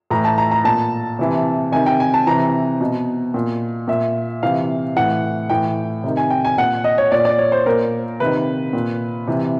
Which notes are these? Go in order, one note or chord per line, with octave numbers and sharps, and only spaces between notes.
A2 E3 A#5
A5
A#5
A#5
A#2 A5
C3 E3
C3 D#3 G#5
G5
G#5
A5
C3 E3 A#5
B2
A#2
A#2 E5
C3 E3 F5
A2 E3 F#5
A2 E3 G5
C3 D#3
G#5
G5
G#5
A#2 F#5
D#5
C#5
A#2 D5
D5
C#5
C5
A#2 A#4
C3 D#3 B4
A#2
C3 E3